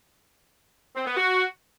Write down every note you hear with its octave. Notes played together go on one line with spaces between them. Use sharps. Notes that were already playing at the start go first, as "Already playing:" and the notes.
C4
B3
F#4